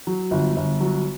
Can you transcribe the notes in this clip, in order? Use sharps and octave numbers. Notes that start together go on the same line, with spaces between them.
F#3
G1
G1
F#3